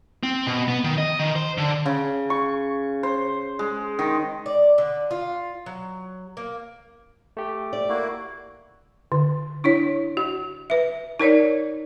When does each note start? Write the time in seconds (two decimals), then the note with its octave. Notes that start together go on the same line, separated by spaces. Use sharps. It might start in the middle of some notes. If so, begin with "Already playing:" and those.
0.23 C4
0.47 B2
0.68 B3
0.84 D#3
0.98 D#5
1.19 D#3
1.36 C5
1.58 D3
1.86 C#3
2.30 C#6
3.03 C5
3.59 G#3
3.99 D#3
4.46 D5
4.78 D3
5.11 F4
5.66 F#3
6.37 A#3
7.37 A3 G4
7.73 D5
7.89 A#3 E4 F#4
9.12 D3
9.64 D4 E4 C#5
10.17 F#4
10.70 B4 E5
11.20 D#4 A#4 C#5 D5